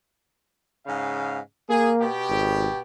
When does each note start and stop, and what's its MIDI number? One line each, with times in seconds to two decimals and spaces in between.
0.87 1.38 44
0.87 1.38 49
0.87 1.38 77
1.70 2.06 58
1.70 1.91 68
2.01 2.80 47
2.01 2.80 67
2.30 2.68 32